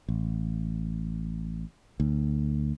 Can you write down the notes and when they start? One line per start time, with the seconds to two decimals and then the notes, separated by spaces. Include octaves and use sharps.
0.08 A1
2.00 D2